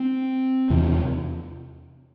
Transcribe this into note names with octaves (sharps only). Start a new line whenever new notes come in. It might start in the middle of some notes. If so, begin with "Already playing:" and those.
Already playing: C4
E2 C3